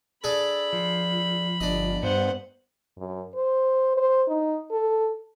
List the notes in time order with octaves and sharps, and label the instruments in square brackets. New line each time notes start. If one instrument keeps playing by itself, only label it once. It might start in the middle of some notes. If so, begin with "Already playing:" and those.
[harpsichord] D4 G#4 A4 [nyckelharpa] B5
[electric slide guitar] F3
[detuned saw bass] G1 [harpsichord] D4 D#5
[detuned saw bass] G2 [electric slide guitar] B3 [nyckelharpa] C5 F#5
[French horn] F#2
C5
C5
D#4
A4